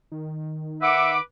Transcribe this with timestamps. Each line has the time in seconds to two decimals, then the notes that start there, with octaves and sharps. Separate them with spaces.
0.12 D#3
0.82 B4 E5 F#5 D6